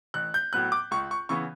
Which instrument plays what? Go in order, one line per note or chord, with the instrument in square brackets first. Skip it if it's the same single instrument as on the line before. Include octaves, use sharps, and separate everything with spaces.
[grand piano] A1 F#6
G6
A2 F#3 B3 F#6
D6
C#2 C#6
C#6
C#3 E3 B3 C#6